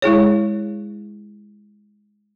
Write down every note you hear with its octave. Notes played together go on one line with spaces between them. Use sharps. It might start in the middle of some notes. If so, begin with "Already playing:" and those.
G#3 E4 G#4 C#5